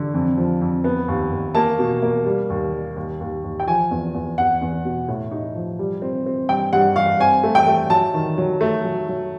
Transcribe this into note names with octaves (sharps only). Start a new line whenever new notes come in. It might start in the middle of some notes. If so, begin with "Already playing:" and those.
Already playing: D3
F2
F3
F2
B3
D#2
D#2
A#3 A5
B2
A#3
G3
D#2
G3
D#2
D#2
D#2
G5
F3 G#5
E2
E2
E2 F#5
E2
B2
A2
D#4
F3
G3
C4
C4
G2 G5
G2 F#5
G2 F5
C4 G#5
A3
G5
A3
F#3 A5
D#3
F#3
A3
F#3
F#3